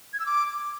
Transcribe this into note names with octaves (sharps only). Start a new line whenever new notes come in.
G#6
E6
D6